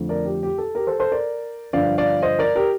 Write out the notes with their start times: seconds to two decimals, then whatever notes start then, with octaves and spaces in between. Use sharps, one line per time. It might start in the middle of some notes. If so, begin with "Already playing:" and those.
Already playing: F2 D3 A3
0.09 A#4 D5
0.25 G4
0.43 G4
0.58 A4
0.75 G4 A#4
0.87 A4 C5
0.99 A4 C5
1.12 A#4 D5
1.73 G2 D3 F3 D5 F5
1.98 D5 F5
2.22 C5 D#5
2.39 A#4 D5
2.56 G4 A#4